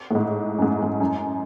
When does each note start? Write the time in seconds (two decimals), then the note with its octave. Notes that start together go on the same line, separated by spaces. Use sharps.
0.11 A2
0.15 G#2
0.58 F#2
0.62 G#2
0.82 G#2
1.00 F#2